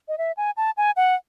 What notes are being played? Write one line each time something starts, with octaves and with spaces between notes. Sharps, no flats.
D#5
E5
G#5
A5
G#5
F#5